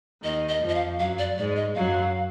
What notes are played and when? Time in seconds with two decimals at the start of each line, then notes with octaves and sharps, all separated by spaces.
0.23 D#2 D#3 D#5
0.49 D#5
0.61 F2 F3
0.69 D#5
0.75 F5
0.99 F#2 F#3 F5
1.19 D5
1.38 G#2 G#3 D5
1.56 D#5
1.75 F#2 F#3 F5